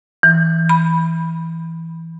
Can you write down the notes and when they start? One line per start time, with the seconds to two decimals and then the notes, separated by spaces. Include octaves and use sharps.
0.23 E3
0.69 B5